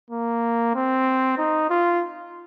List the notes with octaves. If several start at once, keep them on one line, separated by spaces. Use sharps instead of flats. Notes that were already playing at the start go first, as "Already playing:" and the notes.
A#3
C4
D#4
F4